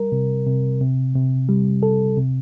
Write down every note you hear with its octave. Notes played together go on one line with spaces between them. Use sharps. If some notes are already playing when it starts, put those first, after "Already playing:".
Already playing: G3 A#4
C3
C3
C3
C3
G3
A4
C3